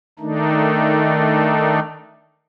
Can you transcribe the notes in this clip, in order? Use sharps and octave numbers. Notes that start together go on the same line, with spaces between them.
D#3 A3 D4 D#4